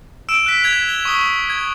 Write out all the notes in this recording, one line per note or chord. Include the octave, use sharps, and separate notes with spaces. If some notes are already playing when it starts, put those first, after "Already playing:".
E6 D7 E7
F#6 B6
G#6 B6 F7
G7
C#6 D#6 G7
G#6